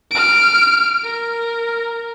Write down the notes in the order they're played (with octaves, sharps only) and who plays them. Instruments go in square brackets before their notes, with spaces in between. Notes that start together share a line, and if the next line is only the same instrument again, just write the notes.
[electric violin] F6 D7
A#4